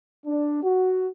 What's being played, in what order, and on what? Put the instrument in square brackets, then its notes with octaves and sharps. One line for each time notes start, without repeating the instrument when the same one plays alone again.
[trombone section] D4
F#4